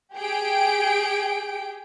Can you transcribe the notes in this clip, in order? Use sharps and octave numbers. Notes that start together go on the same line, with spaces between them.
G4 G#4 G5 D7